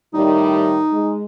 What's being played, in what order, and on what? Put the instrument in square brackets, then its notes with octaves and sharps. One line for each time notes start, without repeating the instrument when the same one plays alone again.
[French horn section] A2 D#3 G3 [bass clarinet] D#4
[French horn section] G#3